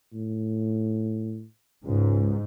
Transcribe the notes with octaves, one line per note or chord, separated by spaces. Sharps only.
A2
C#2 G#2